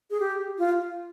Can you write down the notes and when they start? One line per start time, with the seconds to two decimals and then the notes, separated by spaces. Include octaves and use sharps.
0.11 G#4
0.20 G4
0.58 F4